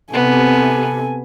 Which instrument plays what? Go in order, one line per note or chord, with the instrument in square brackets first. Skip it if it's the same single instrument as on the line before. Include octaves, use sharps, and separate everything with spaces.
[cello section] C3 [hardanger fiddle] B3 [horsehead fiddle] A4 G#5